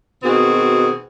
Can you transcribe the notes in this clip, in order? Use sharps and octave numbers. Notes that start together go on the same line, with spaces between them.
B2 D#3 C4 F#4 G#4